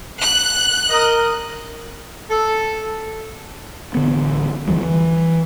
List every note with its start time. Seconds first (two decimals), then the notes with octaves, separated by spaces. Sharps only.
0.20 F#6
0.89 A#4 D#5
2.30 A4
3.94 A1 D3 B3
4.67 D#2 E3 F3 G3
4.82 E3